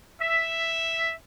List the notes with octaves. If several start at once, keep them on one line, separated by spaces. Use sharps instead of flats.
E5